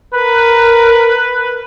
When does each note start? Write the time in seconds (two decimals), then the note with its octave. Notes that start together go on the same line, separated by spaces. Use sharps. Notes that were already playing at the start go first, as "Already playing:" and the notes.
0.14 A#4 B4